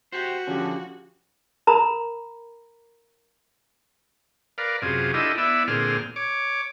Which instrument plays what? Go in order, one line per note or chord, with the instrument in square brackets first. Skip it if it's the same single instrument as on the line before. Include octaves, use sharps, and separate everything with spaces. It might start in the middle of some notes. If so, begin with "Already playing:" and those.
[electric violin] F#4 [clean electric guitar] G4 C5
[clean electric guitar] D3 F3 [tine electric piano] C#4 G4
[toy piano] A#4 A#5 B5
[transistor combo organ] A#4 B4 D5 F5
F#2 C3 F4 G#4
D4 E4 F4 G4 A4 D#5
B3 E4 D5 E5
A#2 D3 C4 G#4 F6
C#5 D6